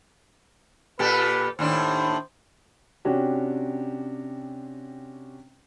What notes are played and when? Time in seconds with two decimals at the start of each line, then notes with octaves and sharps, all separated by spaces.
0.99 A#2 G4 A4 B4
1.59 D#2 A2 D4 C5
3.05 C3 C#4 D4 F#4 G4